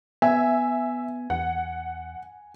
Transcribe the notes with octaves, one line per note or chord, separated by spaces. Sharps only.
B3 E5 G#5
E2 F#5